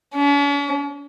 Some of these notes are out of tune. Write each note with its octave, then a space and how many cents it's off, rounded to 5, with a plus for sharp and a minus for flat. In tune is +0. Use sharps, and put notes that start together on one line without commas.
C#4 +45